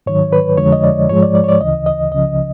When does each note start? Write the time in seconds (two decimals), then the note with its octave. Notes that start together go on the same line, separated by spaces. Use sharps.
0.06 G#2 D#3 F#3 C#5
0.33 B4
0.57 F2 D3 F3 G#3 C#5
0.72 D#5
0.84 D5
1.09 G#2 F3 G#3 C#5
1.22 D5
1.35 D5
1.44 C#5
1.49 D5
1.61 D2 C#3 E3 D#5
1.86 D#5
2.11 C#2 C#3 F3 D#5